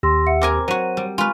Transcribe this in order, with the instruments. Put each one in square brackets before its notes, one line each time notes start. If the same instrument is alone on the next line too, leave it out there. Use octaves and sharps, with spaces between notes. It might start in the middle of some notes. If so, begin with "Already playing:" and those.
[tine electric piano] D#2 G4 E6 [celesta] C6 A#6
[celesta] E5 F#5 C#7
[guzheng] C4 A#4 G#5 [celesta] D6
[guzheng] F#3 F#4 [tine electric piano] C5 [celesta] D#7
[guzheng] G3
[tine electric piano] G#3 [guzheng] F4 B4 [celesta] G#5 C#6 F6